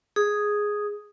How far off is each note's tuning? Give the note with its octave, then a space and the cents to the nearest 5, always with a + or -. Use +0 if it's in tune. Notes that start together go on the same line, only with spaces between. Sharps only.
G#4 +0 D#6 +0